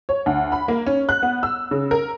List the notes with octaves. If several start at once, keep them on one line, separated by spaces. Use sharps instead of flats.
C#5
D2
B5
A#3
C#4
F#6
B3
E6
C#3
A#4